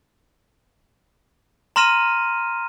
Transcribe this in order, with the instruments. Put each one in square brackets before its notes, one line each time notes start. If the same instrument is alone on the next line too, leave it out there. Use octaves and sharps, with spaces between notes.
[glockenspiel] A#5 C6 F6 A#6 D#7 E7